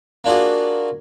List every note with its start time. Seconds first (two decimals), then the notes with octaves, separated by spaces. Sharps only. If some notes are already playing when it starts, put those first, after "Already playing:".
0.24 A#3 D4 F4 F#4 G#4